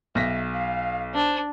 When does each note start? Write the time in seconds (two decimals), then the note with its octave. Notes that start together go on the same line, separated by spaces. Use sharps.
0.15 B1 E5 A#6 B6
0.54 F5
1.14 D4 C5